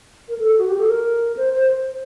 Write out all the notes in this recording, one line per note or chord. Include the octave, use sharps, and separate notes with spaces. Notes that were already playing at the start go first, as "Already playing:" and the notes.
A#4
A4
F#4
G4
A4
A#4
C5
C5